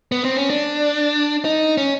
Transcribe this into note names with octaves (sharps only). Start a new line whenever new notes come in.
B3
C4
C#4
D4
D#4
C#4